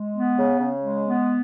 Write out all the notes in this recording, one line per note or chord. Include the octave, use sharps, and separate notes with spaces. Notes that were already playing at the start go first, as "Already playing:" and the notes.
Already playing: G#3
B3
C#3
C#3
G#3
B3